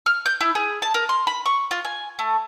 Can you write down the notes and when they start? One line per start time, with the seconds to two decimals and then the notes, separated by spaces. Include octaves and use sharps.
0.06 F6
0.26 G6
0.41 E4
0.55 G#4
0.82 A5
0.94 A#4
1.09 C6
1.27 B5
1.46 C#6
1.71 F4
1.85 G#5
2.19 A3